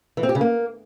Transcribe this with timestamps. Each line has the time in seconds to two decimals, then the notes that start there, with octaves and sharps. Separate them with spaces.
0.17 E3
0.23 C4
0.29 G4
0.35 C#3
0.41 A#3